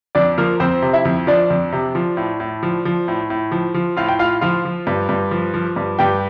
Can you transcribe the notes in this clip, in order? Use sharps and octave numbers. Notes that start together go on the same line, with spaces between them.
F2 D4 D5
F3 A#3 A#4
F2 C4 C5
C3
E4 E5
F2
F3 D4 D5
F2
C3
F3
A2
A2
F3
F3
A2
A2
F3
F3
A2 F4 F5
G5
A2 F4 F5
F3 F4 F5
F3
G2
G2
F3
F3
G2
G2 G4 G5